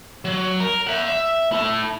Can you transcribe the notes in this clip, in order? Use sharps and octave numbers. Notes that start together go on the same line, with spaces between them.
F#3
A#4
E5 F#5
E5
E4 A4